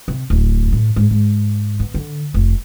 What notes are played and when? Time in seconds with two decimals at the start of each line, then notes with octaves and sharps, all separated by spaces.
0.08 C3
0.30 D1
0.72 A2
0.96 G#2
1.11 G#2
1.80 B3
1.94 D3
2.34 F1